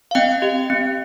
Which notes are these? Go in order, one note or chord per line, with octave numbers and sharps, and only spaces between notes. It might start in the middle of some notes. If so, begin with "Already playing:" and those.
F5
C4 D#5 G5
G4
C4